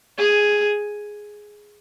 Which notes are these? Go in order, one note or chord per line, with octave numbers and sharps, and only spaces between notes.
G#4